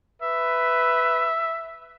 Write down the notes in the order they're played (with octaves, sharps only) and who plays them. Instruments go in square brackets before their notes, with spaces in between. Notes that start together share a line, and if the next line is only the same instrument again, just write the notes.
[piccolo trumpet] B4 [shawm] E5